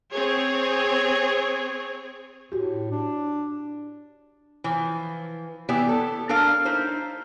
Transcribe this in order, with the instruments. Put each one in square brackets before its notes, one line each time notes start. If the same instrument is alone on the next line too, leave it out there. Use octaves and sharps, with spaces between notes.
[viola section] C4 G#4 C#5
[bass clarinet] A2 [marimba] F#4 G4
[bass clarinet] D4
[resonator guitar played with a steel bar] E3 F3
E3 B3 E4 G4 D5 E5
A4
D4 A4 A#4 F5
D#4 E4 C5